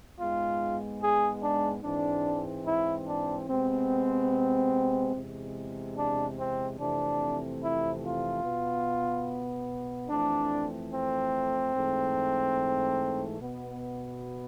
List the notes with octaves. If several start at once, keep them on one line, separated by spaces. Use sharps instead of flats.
G#2 G#3 B3 F4
G#4
D4
G#2 E3 G#3 C4 D4
E4
D4
C3 G#3 B3 C4
E2 C3 G#3
D4
C4
F2 C3 E3 A3 C4 D4
E4
F4
B2 B3
F2 E3 A3 C4 D4
C4
G#2 E3 A3
B2 B3